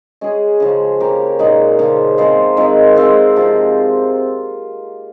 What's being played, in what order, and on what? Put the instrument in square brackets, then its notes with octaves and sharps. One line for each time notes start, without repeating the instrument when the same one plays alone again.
[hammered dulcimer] G#3 C#4 G#4
C#3 F3 G#3
A#3 C#4 G4 A#4
A#2 G#3 D#4
C#3 F3 A#3 F4
G#3 C4 F4 C5
D#3 G#3 C4 F4
G#3 C4 F4
C3 F3 C4 F4